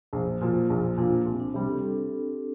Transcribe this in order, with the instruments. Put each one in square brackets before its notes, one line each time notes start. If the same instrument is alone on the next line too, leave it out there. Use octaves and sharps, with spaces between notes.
[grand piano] A#1 [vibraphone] C5
[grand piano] A#2 F3 [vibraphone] F4
[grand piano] A#1
[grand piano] A#2 F3 [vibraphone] D4
[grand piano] C2 [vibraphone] C4
[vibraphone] D4
[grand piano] C3 G3 [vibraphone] G4
[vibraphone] A4
A4